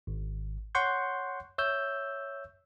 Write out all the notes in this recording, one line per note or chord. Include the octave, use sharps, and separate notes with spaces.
G#1
C#5 F#5 C6 C#6 G6
C#5 E5 E6 G6